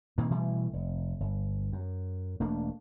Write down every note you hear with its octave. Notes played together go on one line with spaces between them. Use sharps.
A#2 D#3 A#3 C4
B2 E3 G3 A3
F1
G1
F#2
E1 A3 A#3 D4